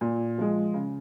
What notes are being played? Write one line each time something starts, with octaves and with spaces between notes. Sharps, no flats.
A#2
F3 G#3
C#3